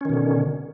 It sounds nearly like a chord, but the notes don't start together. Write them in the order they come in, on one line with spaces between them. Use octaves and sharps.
C#4 D#3 B2 D3